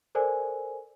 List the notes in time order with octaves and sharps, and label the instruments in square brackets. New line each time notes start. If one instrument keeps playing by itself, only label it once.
[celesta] A4 A#4 C5 D5 G#5